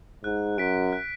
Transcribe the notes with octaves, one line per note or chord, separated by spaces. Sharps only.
G#2 F#6
F#2 B6 D7
F#6